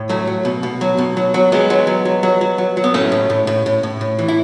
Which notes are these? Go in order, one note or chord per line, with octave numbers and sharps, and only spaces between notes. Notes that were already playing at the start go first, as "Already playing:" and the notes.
Already playing: A2
F#3 A3
F#3
B2
B2
F#3
B2
F#3
F#3
F#3 G#3 B3
F#3
F#3
F#3
F#3
F#3
F#3
F#3
B3
A2 A3 C#4
A2
A2
A2
A2
A2
A2
E3
E4